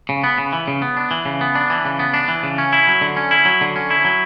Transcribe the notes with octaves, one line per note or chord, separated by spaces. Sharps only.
C#3
B3
C#3
E3
C#3
B3
D4
E3
C#3
B3
D4
E3
C#3
B3
D4
E3
C#3
C#4
E4
F#3
D3
C#4
E4
F#3
D3
C#4
E4
F#3